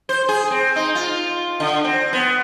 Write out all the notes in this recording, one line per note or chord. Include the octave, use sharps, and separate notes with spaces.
C5
G#4
C4
D#4
F4
D3
C4
B3